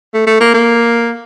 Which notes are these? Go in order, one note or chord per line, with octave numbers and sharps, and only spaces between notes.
A3
A3
A#3
A#3